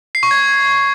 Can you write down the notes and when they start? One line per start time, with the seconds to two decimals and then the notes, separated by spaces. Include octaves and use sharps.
0.15 C7
0.23 C#6
0.31 G#6